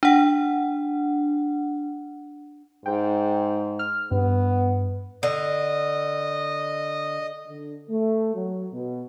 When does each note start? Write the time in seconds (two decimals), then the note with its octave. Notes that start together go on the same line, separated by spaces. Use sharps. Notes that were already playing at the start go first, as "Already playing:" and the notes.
0.03 D4 F#5
2.86 G#2 G5
3.79 F6
4.11 G2 B3
5.23 D3 D#5
7.47 D3
7.89 A3
8.34 F#3
8.73 B2